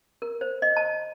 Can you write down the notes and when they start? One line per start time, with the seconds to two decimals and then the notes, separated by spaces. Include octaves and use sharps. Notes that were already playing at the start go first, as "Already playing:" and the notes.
0.22 A#4
0.41 C5
0.62 D#5
0.77 A5